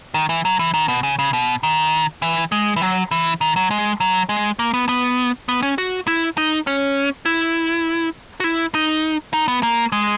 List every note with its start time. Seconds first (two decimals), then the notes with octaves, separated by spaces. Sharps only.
0.14 D#3
0.29 E3
0.45 F#3
0.59 E3
0.74 D#3
0.88 B2
1.03 C#3
1.19 C#3
1.33 B2
1.63 D#3
2.22 E3
2.52 G#3
2.76 E3
2.81 F#3
3.11 E3
3.41 D#3
3.56 F#3
3.71 G#3
4.00 F#3
4.29 G#3
4.59 A#3
4.74 B3
4.89 B3
5.49 B3
5.62 C#4
5.78 F#4
6.07 E4
6.38 D#4
6.67 C#4
7.26 E4
8.40 F#4
8.44 E4
8.75 D#4
9.33 D#4
9.48 B3
9.63 A#3
9.92 G#3